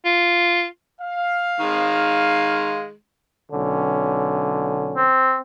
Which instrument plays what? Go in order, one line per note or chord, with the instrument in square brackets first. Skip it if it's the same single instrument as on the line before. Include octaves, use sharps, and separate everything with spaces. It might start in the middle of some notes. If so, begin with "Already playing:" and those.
[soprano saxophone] F4
[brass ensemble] F5
[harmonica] D#3 G#3
[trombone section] B1 D3 C#4
[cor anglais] C4